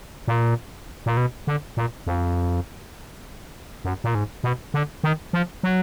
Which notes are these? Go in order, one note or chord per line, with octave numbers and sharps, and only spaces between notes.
A#2
A#2
B2
D3
A#2
F2
F#2
A#2
G#2
B2
D3
D#3
F3
F#3